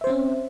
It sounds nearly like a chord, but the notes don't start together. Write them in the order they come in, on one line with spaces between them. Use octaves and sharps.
E5 C5 C4 C#4